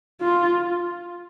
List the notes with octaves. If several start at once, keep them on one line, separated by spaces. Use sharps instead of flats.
F4